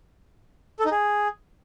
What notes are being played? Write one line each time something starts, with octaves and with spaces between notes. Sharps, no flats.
A4
D#4
G#4